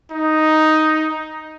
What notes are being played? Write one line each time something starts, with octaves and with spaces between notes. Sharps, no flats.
D#4